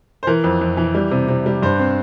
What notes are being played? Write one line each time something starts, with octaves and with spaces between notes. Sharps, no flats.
C5
E3 A#4
F2
F2
E3
G3
C3
C3
G3
G2 C5
C4